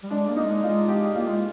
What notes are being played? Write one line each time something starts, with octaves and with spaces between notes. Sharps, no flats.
G3
G#3 D4
A#3
D#4
G#3
G#3 F4
G4
A#3 F4
G#3